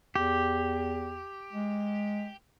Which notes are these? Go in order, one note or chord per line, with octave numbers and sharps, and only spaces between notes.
E2 G4
G#3